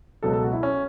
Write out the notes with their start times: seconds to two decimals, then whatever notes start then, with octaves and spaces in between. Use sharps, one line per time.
0.23 C#2 B2 F#3 A4
0.33 A4
0.43 F#4
0.53 E4
0.63 C#4